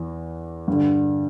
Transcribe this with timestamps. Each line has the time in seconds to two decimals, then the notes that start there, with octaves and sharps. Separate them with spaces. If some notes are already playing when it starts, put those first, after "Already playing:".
Already playing: E2 E3
0.68 G2 D3